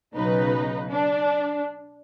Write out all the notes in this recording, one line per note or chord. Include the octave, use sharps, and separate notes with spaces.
B1 C#3 D#4 B4
D4